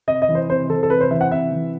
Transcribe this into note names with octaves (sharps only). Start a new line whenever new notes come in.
C3 D#5
D#5
E3
C5
C3 C5
E3 A4
A4
C3 B4
C5
E3 E5
F#5
C3 E5
E3